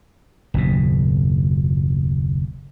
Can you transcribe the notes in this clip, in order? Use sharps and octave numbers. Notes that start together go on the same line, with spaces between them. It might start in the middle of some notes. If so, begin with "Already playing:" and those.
F#1 D#2 B2